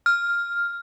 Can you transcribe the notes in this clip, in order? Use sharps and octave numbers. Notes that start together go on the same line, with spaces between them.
F6